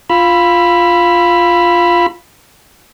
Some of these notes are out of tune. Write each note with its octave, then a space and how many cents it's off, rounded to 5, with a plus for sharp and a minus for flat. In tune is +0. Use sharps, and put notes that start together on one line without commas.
F4 +0 B5 +0 E6 +35